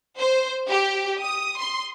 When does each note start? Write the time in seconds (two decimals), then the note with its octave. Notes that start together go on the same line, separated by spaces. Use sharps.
0.17 C5
0.68 G4
1.21 D#6
1.58 C6